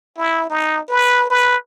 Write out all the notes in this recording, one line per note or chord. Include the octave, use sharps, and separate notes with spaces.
E4
D#4
B4
B4